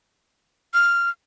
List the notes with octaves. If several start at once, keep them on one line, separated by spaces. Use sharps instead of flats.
F6